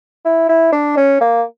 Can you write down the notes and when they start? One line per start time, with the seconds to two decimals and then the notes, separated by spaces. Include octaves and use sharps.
0.25 E4
0.49 E4
0.72 D4
0.97 C#4
1.21 A#3